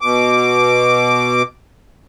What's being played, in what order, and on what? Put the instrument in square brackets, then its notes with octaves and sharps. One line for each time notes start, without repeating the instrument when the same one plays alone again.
[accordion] B2 D6